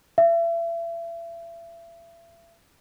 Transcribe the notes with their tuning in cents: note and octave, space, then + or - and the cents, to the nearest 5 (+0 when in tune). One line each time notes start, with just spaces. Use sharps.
E5 +35